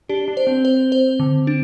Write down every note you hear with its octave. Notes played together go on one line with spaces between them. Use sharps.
D4 G4
D4
C5
C4
C5
C5
D3
D4